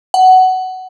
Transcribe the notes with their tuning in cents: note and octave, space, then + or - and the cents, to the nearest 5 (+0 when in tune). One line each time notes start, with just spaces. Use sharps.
F#5 +15